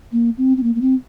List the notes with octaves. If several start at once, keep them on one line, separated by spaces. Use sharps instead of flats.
A#3
C4
C4
A#3
A#3
C4